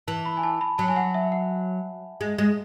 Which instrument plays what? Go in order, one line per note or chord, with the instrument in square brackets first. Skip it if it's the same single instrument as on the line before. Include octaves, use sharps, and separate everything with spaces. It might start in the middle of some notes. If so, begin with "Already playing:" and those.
[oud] E3 [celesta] A5
[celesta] B5
G#5
A5
B5
[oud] F#3 [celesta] A5
[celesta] G#5
F#5
E5
F#5
[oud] G#3
G#3